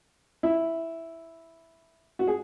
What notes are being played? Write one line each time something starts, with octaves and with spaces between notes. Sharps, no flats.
E4
F#4
G#4